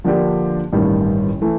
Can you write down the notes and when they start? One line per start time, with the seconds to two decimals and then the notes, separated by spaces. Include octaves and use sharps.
0.04 D3 F3 A#3 D4 G4
0.72 A1 G2 D#3 G3
1.42 E3 A3